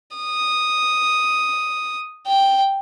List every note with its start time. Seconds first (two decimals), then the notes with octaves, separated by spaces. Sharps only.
0.17 D#6
2.27 G5